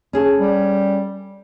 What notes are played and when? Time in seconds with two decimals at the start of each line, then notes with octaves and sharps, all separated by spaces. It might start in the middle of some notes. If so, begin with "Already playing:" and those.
0.13 C#4 G#4 A4
0.40 G3